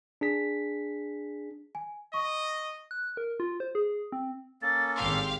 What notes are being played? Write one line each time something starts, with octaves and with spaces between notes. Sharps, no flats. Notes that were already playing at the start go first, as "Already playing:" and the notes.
D4 G#4 B6
G#5
D#5 C#6
F#6
A#4
F4
C5
G#4
C4
A#3 C#4 A4 A6
G#1 G4 F5 C6